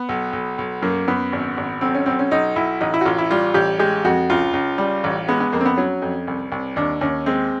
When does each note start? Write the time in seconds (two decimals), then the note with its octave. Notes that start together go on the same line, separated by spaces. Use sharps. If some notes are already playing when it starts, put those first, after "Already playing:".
Already playing: B3
0.09 B1
0.33 B1
0.58 B1
0.82 F#2 A#3
1.08 F#2 B3
1.33 G#1
1.57 G#1
1.81 B1 C4
1.95 C#4
2.06 B1 C4
2.19 C#4
2.31 B1 D#4
2.56 B1 E4
2.81 A1 D#4
2.94 E4
3.01 F#4
3.06 A1 F4
3.18 E4
3.31 G3 F4
3.54 A1 G4
3.79 G#3 G4
4.04 F2 F#4
4.30 C#2 F4
4.53 C#2
4.78 G3
5.04 A1
5.28 G#3 B3
5.40 B3
5.52 F2 A#3
5.61 C4
5.65 B3
5.77 F#3 C#4
6.02 F2
6.27 C2
6.52 C2
6.76 D#2 D4
7.01 D#2 C#4
7.26 G#3 C4